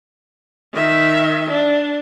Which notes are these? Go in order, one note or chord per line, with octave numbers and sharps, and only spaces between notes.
D#3 E5
D4